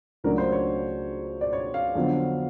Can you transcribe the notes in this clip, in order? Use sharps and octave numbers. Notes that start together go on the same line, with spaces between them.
C#2 C#3 F#3 A3 D4 A#4
C5
C#5
D5
C#5
F5
F2 D3 F#3 B3